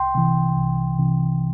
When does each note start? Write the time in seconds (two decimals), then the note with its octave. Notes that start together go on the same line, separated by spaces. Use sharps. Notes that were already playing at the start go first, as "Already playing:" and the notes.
Already playing: C2 G5 C6
0.15 C3 E3
0.57 C2
0.99 C3 E3